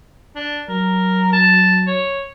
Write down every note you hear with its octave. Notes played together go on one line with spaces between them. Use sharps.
D4
F#3 A#4
A5
C#5